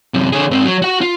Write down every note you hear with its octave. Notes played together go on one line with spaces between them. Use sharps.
F#2 C3
D3 G#4
G#2 C4
F#3
F#4 F#5
F4